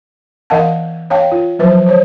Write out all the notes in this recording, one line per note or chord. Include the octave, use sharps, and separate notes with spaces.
E3 A#4 D#5 F5 F#5 A5
C#5 F5 G5 A5
F4
F3 F#3 B4 C5
C5 C#5